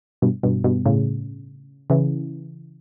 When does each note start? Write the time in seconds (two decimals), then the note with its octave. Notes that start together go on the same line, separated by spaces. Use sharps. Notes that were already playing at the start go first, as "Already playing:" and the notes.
0.22 G2 B2
0.43 G2 B2
0.64 G2 B2
0.85 A2 C#3
1.90 C#3 E3